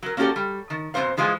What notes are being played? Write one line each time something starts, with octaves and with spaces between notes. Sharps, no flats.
F#3 A#4
A#3 C#4 F#4 G4 A4 D5
G3
D#3
F2 B2 D#3 A3 C5 F5
E3 F3 G#3 F4 G#4